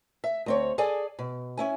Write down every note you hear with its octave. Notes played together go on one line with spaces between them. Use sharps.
E5
D2 C4 C#5
G#4 A4 D5 G#5
B2
C#4 E4 G#5